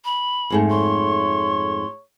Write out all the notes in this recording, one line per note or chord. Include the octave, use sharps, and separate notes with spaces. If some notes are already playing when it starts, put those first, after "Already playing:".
B5
F2 G#2 A3
C#5 C6